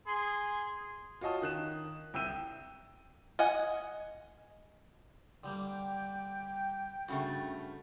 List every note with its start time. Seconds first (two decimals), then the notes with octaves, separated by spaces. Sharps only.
0.07 G#4 C6
1.21 F4 F#4 C#5 D#5 A5 D#6
1.42 D#3 F#6 E7
2.14 C2 G5 E6 D#7
3.39 D#5 F#5 G#5
5.44 D3 G3 A#3 G5
7.08 G2 C#3 A3 F#4 A#4